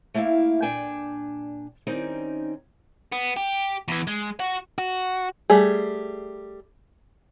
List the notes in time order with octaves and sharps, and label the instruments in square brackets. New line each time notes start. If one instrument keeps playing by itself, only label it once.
[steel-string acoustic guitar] A3 A#3 E4 E5 F5
A#2 D4 G5 G#5
D#3 G3 C4 C#4 D#4
[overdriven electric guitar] B3
G4
E2 E3
G#3
F#4 F#5
[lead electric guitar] F#4
[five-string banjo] G3 A3 G#4